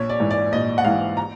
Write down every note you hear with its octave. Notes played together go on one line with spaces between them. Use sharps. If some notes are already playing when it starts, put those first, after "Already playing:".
Already playing: A#1 C#5
D5
G#2 E3
D5
A#1 D#5
F#5
G#2 E3 F5
A#5